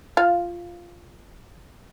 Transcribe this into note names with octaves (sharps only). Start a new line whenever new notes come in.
F4 F5